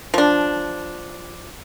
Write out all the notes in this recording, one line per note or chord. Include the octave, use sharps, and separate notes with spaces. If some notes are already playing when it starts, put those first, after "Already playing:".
F3 D4